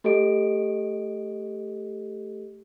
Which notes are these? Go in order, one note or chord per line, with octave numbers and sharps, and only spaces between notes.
A3 G4 A4 D#5 D7